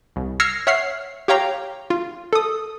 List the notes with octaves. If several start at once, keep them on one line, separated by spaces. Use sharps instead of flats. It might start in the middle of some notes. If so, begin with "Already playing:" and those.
C2
E6 F6 G#6 A#6 C7 C#7
C#5 E5 F#5 F6 C7
G4 C#5 F5 G5 A#5
F4
A4 D#6